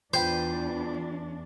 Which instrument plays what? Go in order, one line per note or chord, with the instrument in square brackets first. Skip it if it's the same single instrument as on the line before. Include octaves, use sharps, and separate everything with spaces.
[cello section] E2 D4 [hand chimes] F4 [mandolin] B4 G5 G6 [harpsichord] C5